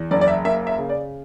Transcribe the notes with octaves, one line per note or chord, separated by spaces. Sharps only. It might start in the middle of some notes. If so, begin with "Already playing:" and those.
Already playing: E2
F#1 D5
D5
E5
A#3 E5
E5
C#3
D5